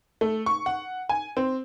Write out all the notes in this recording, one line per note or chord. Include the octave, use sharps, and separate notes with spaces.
A3
C#6
F#5
G#5
C4